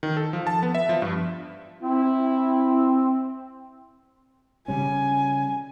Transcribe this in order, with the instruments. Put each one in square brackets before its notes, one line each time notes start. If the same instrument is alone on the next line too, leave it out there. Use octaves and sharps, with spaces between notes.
[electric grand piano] D#3
A4
F3
A5
B3
E5
F3
G2
[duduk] C4 [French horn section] E4
[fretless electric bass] C#3 G3 C#4 [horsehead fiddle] G#5